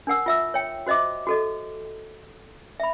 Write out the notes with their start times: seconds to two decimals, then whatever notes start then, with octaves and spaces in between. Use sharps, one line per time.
0.07 D4 A#4 F#5 E6
0.26 F4 E5 E6
0.54 C#5 G5
0.87 F#4 C5 D#5 E5 D6
1.27 F#4 A4 D#5
2.80 E5 B5